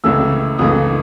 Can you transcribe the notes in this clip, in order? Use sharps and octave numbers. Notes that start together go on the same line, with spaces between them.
C#2 C#3 E3 A3 E6
C#2 C#3 E3 A3 D#6